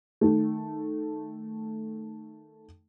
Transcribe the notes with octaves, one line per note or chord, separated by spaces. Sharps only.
D#3 A3